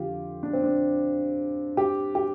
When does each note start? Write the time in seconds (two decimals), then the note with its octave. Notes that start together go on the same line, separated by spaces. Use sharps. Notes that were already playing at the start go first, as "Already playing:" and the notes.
Already playing: F2 D3 F4 G4
0.43 D4
0.53 C4
0.63 D4
1.77 G4
2.15 G4